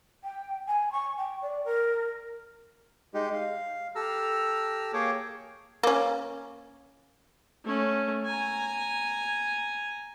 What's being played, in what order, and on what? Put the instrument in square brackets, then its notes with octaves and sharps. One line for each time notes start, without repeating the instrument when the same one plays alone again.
[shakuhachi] G5
G#5
C#6
G5
D5
A#4
[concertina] G#3 D#4 G4
F5
G4 A4 A#5 E6 F6
A#3 G#4 C#5 G5 D6
[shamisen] A#3 C#4
[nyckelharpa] A3 C#4
G#5 A#5